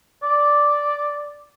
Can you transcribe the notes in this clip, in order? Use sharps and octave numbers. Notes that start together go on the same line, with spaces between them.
D5